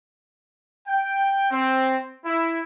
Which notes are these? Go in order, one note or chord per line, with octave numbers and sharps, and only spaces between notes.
G5
C4
E4